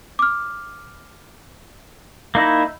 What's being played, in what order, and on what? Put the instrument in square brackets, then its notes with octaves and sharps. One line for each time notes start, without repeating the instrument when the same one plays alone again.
[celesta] D6 F6
[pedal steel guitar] A#3 D#4 E4